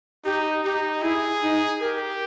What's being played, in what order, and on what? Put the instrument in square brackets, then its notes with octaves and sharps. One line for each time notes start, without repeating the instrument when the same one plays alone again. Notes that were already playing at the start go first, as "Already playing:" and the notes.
[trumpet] D#4 [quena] G4
[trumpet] D#4 [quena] G4
[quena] E4 [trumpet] G#4
[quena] D#4
[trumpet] G4 [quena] A#4